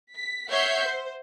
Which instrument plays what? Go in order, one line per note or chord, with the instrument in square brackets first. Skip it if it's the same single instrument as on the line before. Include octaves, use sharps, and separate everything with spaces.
[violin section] B6
C#5 E5 F#5 G6 C7
C5